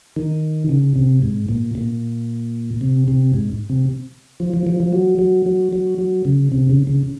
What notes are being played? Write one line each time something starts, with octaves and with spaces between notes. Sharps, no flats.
D#3
C#3
C3
G#2
A#2
A#2
C3
C3
G#2
C3
F3
F3
F3
F3
F#3
F#3
F#3
F#3
F#3
C#3
C3
C#3
C#3